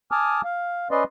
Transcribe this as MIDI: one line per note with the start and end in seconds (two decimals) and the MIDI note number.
0.11 0.41 80
0.11 0.41 81
0.11 0.41 86
0.11 0.41 87
0.11 0.41 89
0.44 0.88 77
0.91 1.04 61
0.91 1.04 71
0.91 1.04 74
0.91 1.04 75
0.91 1.04 84